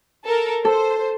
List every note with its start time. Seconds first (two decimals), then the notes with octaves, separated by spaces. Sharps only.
0.24 A4 A#4
0.65 A4 C5